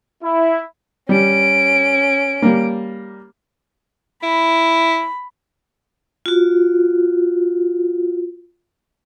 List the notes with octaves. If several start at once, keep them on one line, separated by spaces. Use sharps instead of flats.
E4
G3 C#4 D7
G3 A#3
E4 B5
F4 F#4